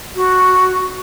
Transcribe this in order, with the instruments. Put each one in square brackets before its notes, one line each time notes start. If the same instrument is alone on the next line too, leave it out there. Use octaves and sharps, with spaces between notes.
[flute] F#4